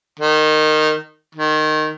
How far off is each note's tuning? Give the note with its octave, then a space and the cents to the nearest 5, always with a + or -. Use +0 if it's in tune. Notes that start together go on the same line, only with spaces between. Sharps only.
D#3 -15
D#3 -15